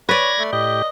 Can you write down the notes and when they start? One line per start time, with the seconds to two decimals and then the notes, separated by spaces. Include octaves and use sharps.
0.09 B4 C#5 D5 G#6 A#6
0.39 A3
0.53 A2 G4 D#5